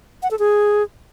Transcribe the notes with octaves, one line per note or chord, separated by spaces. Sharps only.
F#5
A4
G#4